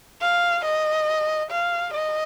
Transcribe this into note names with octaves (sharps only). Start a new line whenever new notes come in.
F5
D#5
F5
D#5